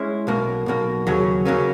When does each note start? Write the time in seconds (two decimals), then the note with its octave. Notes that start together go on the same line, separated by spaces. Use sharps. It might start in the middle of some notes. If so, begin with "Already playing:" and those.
Already playing: G#3 C#4 E4
0.27 B1 B2 A#3
0.66 B1 B2 A#3
1.07 D#2 C#3 F#3 A#3 C#4
1.45 C#3 F#3 A#3 C#4